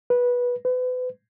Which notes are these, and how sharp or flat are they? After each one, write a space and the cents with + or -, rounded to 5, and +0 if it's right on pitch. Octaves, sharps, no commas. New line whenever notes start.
B4 -15
B4 +35